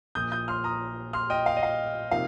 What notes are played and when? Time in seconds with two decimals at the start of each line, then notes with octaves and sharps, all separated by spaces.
0.15 A#1 A#2 F3 D#6 G6
0.32 D#6 G6
0.48 C6 F6
0.64 A#5 D#6
1.13 C6 F6
1.30 D#5 G5
1.46 F5
1.56 D#5
1.63 F5
2.11 C3 F3 A#3 D#4 F5